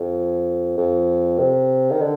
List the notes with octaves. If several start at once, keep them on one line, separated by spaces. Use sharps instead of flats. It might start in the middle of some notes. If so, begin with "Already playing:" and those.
Already playing: F2
F2
C3
D#3
D3